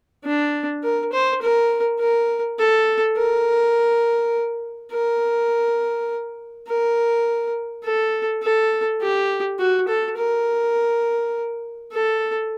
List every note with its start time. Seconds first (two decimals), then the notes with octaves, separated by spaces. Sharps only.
0.25 D4
0.83 A#4
1.13 C5
1.42 A#4
2.00 A#4
2.59 A4
3.17 A#4
4.92 A#4
6.67 A#4
7.84 A4
8.42 A4
9.01 G4
9.59 F#4
9.88 A4
10.17 A#4
11.93 A4